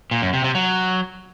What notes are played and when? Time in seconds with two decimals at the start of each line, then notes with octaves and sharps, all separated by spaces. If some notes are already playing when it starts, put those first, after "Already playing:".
0.11 A#2
0.22 F#2
0.33 C3
0.44 C3
0.55 F#3